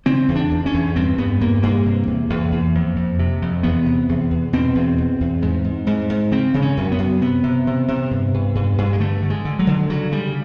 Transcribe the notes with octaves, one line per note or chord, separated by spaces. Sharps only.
C#3 C4
E2
D4
E2
C#4
E2
G2 C4
G2 B3
G2 A#3
G2 A#3
C3
E2
E2
E2
F2
F2
C3
F2
E2 B3
C3
E2
E2
B2 C4
E2
E2
E2
G#2
G#2
G#2
G#2
C#3 C4
C#3
C#4
F#2
B3
F#2
C3 B3
C3
C3
C3
G2
G2
G2
G2
G#3
D3 A3
D3
G#3
D3
F#3
D3
C#3 F#3
C#3 G3